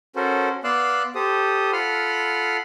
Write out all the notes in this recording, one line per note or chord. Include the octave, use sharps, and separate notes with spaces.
C#4 F#4 A4 A#4 C5
B3 D5 F5 C6 E6 F#6
G4 A4 C5 D#6
F4 A4 F#5 B5 C6 F6